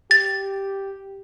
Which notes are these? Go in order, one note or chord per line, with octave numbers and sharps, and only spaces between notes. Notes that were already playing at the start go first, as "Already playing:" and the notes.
G4 A6